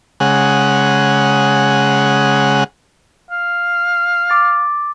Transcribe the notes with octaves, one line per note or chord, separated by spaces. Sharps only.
C#3 G#3 F#5
F5
D6 A6